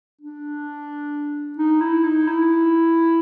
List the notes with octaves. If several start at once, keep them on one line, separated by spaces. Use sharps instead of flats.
D4
D#4
E4
D#4
E4